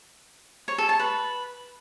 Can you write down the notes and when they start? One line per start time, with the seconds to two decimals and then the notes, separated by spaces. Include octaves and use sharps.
0.68 C#5
0.78 A4
0.89 A5
0.99 B4